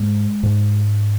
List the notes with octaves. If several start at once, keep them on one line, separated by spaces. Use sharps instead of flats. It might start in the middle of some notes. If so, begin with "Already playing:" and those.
Already playing: G#2 G#3
G#2